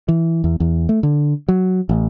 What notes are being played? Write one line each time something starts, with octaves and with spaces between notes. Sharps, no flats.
E3
E2
E2
A3
D3
F#3
A1